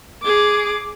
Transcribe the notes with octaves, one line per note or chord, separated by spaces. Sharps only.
G#4 D6